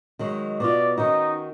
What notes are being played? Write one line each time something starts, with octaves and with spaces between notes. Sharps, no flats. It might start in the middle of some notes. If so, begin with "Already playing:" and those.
D#3 F#3 G#3
B2 F4 D5
D#3 C#4 D#4 F#4